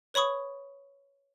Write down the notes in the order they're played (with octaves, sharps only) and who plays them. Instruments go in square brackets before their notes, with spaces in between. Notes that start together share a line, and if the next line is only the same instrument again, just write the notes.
[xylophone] B4 C#5 B5 C#6 D#6